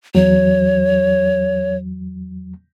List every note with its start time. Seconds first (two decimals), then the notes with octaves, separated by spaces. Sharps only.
0.15 E2 F#3 C#5